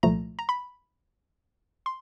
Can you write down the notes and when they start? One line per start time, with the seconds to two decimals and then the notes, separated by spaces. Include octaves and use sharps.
0.03 C2 A#2 F3 A3 A#5
0.39 A#5
0.49 B5
1.86 C6